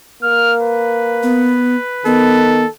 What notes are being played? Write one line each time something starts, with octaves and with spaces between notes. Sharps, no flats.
A#3 F6
B4
B3
D#3 B3 A4